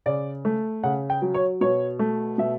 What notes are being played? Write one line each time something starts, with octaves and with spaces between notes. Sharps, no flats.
C#3 D5
A3
C#3 F#5
G5
F#3
C#5
B2 C#5
A3
B2 E5